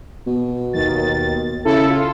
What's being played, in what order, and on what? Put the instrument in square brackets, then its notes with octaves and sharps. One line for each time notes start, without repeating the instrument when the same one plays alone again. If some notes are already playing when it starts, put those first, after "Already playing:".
[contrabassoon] B2
[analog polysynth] D#2 D#3 A6
[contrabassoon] C#3 [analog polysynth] E4 A4
[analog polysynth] F4